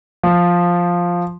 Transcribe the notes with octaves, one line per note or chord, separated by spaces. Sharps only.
F3